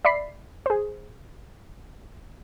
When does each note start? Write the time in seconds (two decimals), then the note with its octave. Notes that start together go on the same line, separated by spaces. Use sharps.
0.05 D5 E5 B5 B6 C7
0.66 G#4 C5